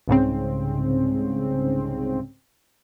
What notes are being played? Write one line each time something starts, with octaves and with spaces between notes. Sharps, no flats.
C2 G#2 C#3 C4